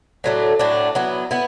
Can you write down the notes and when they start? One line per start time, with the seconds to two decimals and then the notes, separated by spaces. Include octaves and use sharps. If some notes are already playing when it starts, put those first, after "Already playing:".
0.24 A2 F#3 A3 D4
0.59 A2 F#3 A3 D4
0.95 F#3 B3 E4
1.31 B3 E4